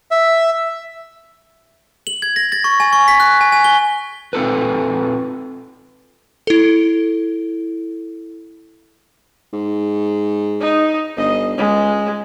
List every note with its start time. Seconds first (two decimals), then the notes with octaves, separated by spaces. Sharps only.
0.11 E5
2.07 F#7
2.22 G#6
2.36 A#6
2.52 A6
2.64 C#6
2.80 G#5
2.93 C#6
3.08 B6
3.20 F#6
3.41 G#5
3.52 G#5
3.64 G7
4.33 C4 F4 A4 B4
6.47 E4 A4
9.53 G#2
10.60 D#4
11.17 G1 D#5
11.58 C#2 G#3